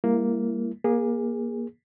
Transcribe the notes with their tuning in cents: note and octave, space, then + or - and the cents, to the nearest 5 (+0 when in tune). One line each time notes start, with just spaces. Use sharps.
G3 +40 A#3 +0 E4 +20
A#3 +20 G#4 -15